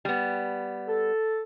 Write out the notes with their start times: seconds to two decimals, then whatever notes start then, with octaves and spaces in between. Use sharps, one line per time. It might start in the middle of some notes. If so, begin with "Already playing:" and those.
0.05 G3 B3
0.87 A4